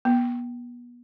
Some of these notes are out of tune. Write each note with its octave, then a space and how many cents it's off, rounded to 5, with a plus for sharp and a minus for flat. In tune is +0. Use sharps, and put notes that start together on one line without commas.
B3 -35